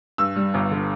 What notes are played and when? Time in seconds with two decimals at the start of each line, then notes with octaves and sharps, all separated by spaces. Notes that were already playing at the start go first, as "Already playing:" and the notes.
0.18 G2 E6
0.36 G3
0.54 G1
0.71 D3